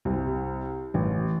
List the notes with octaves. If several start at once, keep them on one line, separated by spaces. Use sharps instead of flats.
C2
A1